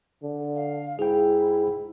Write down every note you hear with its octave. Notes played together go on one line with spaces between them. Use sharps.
D3
F5
G#2 E4 G#4 G5